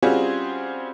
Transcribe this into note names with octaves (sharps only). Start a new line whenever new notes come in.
G3 C4 C#4 F4 F#4 G#4